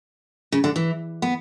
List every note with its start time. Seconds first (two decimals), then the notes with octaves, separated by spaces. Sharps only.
0.52 C#3
0.64 D3
0.76 E3
1.22 B3